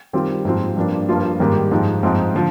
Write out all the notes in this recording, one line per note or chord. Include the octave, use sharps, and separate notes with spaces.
D#3 G3 C4 F4
G#2 F3 C4 F4
G2 F3 A#3 D4
G2 F3 A#3 F4
G#2 D#3 G3 A#3
G#2 F3 G#3 D#4
G#2 F3 C4 D#4
D3 F3